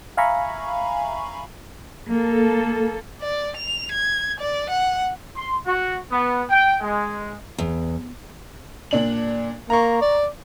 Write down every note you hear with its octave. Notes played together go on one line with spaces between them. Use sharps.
E5 F5 G#5 A#5 B5 C#6
A#3 A4
D5
F7
G#6
D5
F#5
C6
F#4
B3
G5
G#3
E2
A#2 D4 F#7
A#3 A#5 C#6
D5